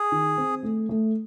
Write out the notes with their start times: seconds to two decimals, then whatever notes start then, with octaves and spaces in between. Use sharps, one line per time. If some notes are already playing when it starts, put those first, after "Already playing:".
Already playing: G#4
0.12 D#3
0.37 C4
0.63 A3
0.89 A3